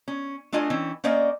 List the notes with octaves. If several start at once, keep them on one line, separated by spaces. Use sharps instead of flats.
C#4
A3 D4 F4 D#5 G#5
E3 C4 C#4
A#3 C#4 C5 D5 D#5